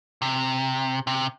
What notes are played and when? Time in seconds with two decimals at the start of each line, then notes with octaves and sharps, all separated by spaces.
0.22 C3
1.07 C3